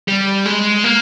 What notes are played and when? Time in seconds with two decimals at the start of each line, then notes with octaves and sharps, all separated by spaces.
0.08 G3
0.46 G#3
0.84 A#3